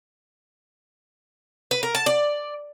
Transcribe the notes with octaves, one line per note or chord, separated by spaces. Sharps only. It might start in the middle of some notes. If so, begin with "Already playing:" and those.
B4
A#4
A5
D5